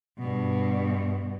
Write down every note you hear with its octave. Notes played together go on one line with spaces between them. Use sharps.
G2 B2